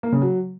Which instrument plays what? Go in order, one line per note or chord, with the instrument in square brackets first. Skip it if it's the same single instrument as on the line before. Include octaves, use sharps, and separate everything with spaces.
[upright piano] A#3
C#3
F#3